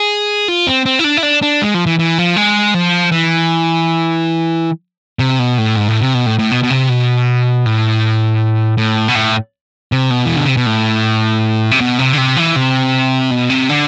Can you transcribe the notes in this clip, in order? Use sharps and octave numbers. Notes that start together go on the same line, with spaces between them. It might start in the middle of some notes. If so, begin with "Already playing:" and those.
Already playing: G#4
F4
C4
C4
E4
D4
E4
D4
D4
G#3
F3
E3
E3
F3
G#3
F3
E3
C3
B2
A2
G#2
A2
C3
B2
A2
A2
B2
B2
C3
B2
A2
A2
B2
A2
C3
B2
E3
D3
C3
B2
A2
C3
B2
C3
D3
C3
E3
C3
B2
C3
D3